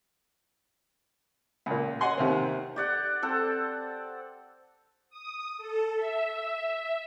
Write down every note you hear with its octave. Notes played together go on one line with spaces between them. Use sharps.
C#2 A#2
D#5 F#5 G#5 C6
D#2 C3 C4
G4 D5 F#5
C4 A4 F#5
D#6
A4
E5